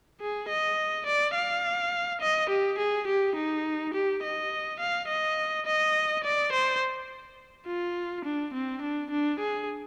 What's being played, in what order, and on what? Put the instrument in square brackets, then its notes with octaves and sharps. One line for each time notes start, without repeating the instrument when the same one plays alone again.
[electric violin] G#4
D#5
D5
F5
D#5
G4
G#4
G4
D#4
G4
D#5
F5
D#5
D#5
D5
C5
F4
D4
C4
D4
D4
G#4